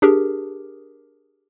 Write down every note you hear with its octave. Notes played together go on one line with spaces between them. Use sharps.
D4 G4 G#4 A#4